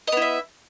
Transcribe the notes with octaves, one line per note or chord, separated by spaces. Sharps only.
B3 E4 D#5 E5